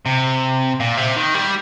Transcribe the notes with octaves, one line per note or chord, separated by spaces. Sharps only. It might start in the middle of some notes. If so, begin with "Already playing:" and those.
C3
A#2
C3
D#3
G3